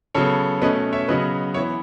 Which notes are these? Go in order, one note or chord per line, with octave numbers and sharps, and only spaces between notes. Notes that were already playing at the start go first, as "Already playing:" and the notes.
C#3 F#3 B3 A4 C#5
B2 A3 C#4 B4 D#5
C#5 E5
C#3 F#3 B3 B4 D#5
E3 B3 C#5 E5